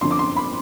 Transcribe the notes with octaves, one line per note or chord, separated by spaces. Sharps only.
G1 F2 D3 C6
D6
C6
B5